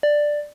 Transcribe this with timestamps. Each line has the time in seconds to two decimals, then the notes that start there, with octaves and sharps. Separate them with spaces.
0.03 D5